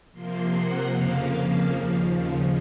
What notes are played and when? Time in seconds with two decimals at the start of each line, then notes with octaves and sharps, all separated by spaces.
0.12 C3 F3 A#3 C6
0.52 F#5
0.91 F2 C#3 F3 A#3 F5
1.71 D#2 C#3 F3